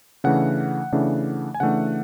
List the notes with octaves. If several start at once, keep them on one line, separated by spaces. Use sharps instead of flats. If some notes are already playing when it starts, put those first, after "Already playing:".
C#3 E3 A3 D4 F#5
C#3 E3 A3 D4
G#5
C#3 E3 A3 D4 F#5